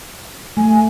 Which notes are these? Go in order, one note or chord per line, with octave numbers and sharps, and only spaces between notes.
A3 G#5